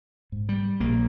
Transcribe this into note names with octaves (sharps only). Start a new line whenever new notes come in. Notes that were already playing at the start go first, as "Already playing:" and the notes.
G#2
G3
A#1 A#3